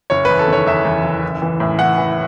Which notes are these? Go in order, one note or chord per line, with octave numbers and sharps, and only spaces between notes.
F#1 C#5
E2 B4
A4
D#3 C#5
E2 E5
E2
F#1
A1
E3
A2
E3 F#5
E3